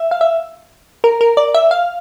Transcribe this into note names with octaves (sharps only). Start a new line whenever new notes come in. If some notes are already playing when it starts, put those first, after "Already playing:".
Already playing: E5
F5
E5
A#4
A#4
D5
E5
F5